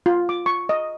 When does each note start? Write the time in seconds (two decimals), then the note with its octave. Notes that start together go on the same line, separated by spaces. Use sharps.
0.06 F4
0.29 D6
0.46 C#6
0.69 D#5